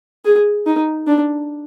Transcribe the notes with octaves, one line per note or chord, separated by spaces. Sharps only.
G#4
D#4
D4